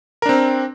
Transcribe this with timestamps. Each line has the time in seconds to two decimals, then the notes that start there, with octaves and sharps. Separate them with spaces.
0.22 A#4
0.26 D4
0.29 C4